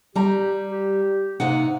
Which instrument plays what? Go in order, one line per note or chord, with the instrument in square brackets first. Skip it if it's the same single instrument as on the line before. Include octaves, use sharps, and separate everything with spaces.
[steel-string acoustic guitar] G3 A#5 [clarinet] G4
[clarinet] G4
[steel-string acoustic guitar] C3 D#4 F#5 [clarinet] A#3